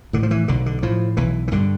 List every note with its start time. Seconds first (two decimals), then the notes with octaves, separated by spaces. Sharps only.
0.13 A2 D3
0.23 F3
0.31 E3
0.48 B1 D3
0.66 D3
0.82 A2 F3
1.17 B1 E3
1.48 E3
1.52 G2 D3